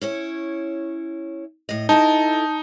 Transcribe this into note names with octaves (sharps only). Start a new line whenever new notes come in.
C#4 E4 C#5
A2 D#5
D#4 E4 A4 D#5 A5